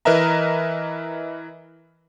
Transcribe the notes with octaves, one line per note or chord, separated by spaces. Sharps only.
E3 A#4 B4 D#5 E5 A#5